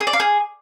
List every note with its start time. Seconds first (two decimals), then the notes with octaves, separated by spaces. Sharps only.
0.01 G#4
0.07 D5
0.13 F5
0.20 G#4